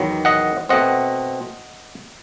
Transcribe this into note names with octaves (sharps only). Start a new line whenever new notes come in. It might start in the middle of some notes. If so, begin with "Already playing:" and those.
Already playing: E2 D#3 F#3
D#5 F#5
B2 A3 C4 D#5 F#5